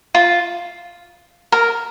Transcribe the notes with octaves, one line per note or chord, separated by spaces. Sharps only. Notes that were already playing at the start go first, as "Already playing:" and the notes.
F4
A#4